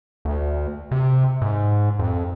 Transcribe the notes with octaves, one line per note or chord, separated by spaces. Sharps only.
D2
C3
G#2
F2